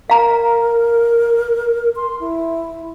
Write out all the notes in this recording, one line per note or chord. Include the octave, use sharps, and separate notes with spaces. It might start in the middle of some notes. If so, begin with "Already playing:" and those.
A#4 F5 A#5
C6
E4